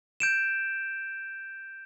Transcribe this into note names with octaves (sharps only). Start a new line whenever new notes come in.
G6 D7 E7